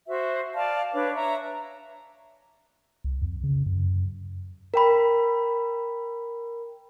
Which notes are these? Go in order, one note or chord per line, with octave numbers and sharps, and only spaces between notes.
F#4 C5 E5
D5 F5 A5
D4 B4 C#5 D6
C#5 E5 A#5
C2
F2
C#3
F#2
A#4 G5 B5